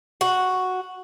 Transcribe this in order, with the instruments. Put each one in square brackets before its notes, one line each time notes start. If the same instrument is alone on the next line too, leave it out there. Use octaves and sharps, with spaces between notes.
[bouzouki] F#4